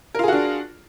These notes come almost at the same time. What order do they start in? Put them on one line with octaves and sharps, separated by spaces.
A#4 F4 G#4 F#4 D4